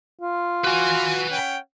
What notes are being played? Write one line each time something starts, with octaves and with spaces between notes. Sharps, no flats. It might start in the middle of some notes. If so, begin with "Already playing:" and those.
F4
F#4 B4 G#5
C#4 F#5 G5